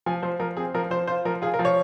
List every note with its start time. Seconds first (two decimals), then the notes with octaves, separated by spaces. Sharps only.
0.06 F3 G#5
0.23 F3 C5
0.40 F3 A#4
0.57 C4 G#4
0.74 F3 A#4
0.90 F3 C5
1.07 F4 C5
1.25 F3 A#4
1.42 F4 G#4
1.54 A#4
1.59 F3
1.65 C#5